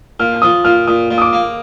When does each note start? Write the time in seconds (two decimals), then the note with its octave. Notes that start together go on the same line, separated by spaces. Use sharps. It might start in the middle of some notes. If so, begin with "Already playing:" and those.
0.20 A#2 F6
0.42 F3 D#6
0.65 A#2 F6
0.87 A#2 D#6
1.11 A#2
1.18 D#6
1.22 D6
1.33 A#3